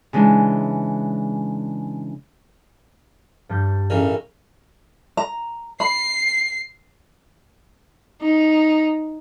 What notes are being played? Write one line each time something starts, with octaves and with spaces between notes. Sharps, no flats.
C#3 E3 G#3 D4
G2 G3 G6
A1 C#3 E4 G#4 A#4
A#5
B5 C7
D#4